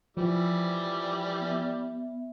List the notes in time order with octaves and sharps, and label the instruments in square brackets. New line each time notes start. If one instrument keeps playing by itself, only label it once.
[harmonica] E3 G3 [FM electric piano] F3
[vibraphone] B3 E5